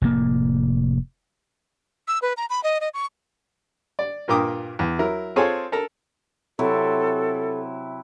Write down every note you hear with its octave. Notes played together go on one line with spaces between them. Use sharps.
F1 A2 A#3
E6
B4
A#5
B5
D#5
D#5
C#6
D5
G2 A#2 A#4 G5 D6 D#6
E2
F#3 E4 A#4
C4 F4 G#4 A4 C#5 G#5
A4 A#4 A#5
C3 F#3 E4 A4